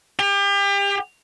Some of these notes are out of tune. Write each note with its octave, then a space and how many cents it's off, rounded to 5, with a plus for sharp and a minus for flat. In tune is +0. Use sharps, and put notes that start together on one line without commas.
G4 +35